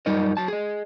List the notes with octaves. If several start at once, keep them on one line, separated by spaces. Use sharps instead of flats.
F#2 G3 D#4 A#4 D#5
F#3 A5
G#4 D#5